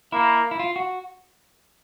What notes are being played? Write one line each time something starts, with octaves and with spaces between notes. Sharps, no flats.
A#3 E4
E4
F4
F#4